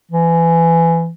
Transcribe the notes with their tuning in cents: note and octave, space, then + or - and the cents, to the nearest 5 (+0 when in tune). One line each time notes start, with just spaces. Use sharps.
E3 +20